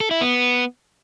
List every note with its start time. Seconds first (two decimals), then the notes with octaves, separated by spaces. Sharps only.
0.01 A4
0.11 E4
0.21 B3